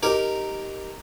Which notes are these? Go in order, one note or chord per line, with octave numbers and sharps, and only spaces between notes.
D#4 G4 A#4